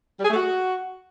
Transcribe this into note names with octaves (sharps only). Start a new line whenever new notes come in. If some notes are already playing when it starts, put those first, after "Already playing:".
G3
G#4
A3
F#4